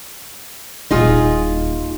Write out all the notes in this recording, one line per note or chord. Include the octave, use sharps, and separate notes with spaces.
D#1 A#2 D#4 F4 G#4